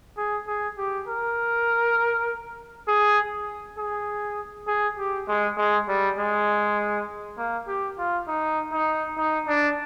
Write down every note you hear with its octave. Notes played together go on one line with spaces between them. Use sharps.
G#4
G#4
G4
A#4
G#4
G#4
G#4
G4
G#3
G#3
G3
G#3
A#3
G4
F4
D#4
D#4
D#4
D4